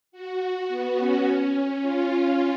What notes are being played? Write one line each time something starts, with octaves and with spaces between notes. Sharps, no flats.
F#4
B3
C#4
F4
C#4